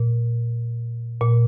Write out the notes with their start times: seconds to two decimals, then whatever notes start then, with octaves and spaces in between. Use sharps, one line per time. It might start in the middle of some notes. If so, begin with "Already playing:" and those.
Already playing: A#2
1.21 A#2